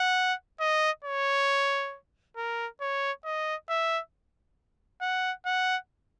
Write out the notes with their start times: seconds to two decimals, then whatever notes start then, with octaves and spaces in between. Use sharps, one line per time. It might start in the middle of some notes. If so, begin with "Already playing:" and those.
Already playing: F#5
0.60 D#5
1.04 C#5
2.37 A#4
2.81 C#5
3.24 D#5
3.69 E5
5.01 F#5
5.46 F#5